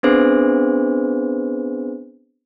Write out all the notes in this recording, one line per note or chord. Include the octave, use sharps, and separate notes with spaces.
B3 C4 D4 G#4 B4 C5